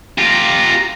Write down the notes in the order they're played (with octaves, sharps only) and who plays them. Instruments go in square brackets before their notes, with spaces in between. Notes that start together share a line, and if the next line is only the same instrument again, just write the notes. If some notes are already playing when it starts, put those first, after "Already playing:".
[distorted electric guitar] F4 G4 [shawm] A#5